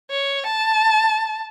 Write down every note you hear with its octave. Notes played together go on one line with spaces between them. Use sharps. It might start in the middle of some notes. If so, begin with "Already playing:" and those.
C#5
A5